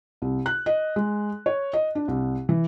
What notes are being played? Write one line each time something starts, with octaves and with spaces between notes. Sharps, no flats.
C2
F#6
D#5
G#3
C#5
D#5
D4
C2
E3